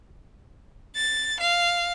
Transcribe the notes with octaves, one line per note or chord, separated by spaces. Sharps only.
A6
F5